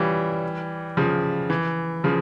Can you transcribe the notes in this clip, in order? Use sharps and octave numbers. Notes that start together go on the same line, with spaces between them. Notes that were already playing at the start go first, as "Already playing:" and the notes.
Already playing: E3 G3 C#4 F4
C#3 F3
E3
C#3 F3